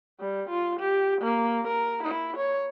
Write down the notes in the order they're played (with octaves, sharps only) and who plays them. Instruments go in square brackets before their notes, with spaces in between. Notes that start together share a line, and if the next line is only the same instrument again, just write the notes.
[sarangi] G3
F4
G4
A#3
A#4
E4
C#5